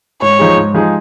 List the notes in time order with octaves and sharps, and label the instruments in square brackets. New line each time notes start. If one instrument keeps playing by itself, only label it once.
[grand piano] G#2 [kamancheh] C#5
[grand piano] F3 G#3 D#4 G#4
G#2
F3 G#3 D#4 G#4